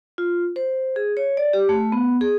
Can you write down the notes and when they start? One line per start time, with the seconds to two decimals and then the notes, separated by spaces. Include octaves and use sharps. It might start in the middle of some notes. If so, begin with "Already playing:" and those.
0.18 F4
0.56 C5
0.96 G#4
1.17 C#5
1.37 D5
1.53 G4
1.69 A3
1.92 B3
2.21 G#4